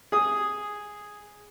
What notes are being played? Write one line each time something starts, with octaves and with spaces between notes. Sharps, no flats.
G#4 D#6